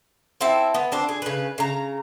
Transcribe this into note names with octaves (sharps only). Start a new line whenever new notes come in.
C4 E4 G5 A5
B3
C4 D4 C5
G#4
C#3 B4
C#3 A#5